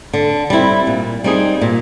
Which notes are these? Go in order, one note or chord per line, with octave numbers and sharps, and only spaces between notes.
D3
G3 C4 E4
A#2
G3 C4 D#4 G#4
A#2